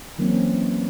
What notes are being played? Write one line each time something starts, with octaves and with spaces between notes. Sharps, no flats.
E3 F#3 A#3 C4 C#4